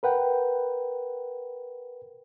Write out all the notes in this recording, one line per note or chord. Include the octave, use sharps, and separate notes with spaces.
A#4 B4 F#5 G5